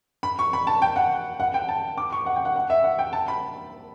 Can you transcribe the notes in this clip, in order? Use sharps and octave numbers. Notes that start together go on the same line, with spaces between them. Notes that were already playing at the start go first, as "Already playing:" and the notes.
B5
C#6
B5
A5
G5
F#5
F#5
G5
A5
D6
C#6
F#5
G5
F#5
F#5
E5
F#5
G5
A5
B5